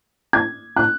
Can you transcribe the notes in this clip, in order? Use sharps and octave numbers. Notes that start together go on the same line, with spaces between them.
G#6
F#6